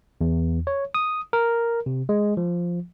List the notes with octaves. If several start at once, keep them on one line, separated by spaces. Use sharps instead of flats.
E2
C#5
D#6
A#4
C3
G#3
F3